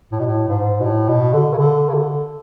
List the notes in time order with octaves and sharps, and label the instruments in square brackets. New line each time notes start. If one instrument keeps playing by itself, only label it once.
[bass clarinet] A2
B2
A2
G#2
B2
A2
B2
D3
C#3
D3
C#3
D3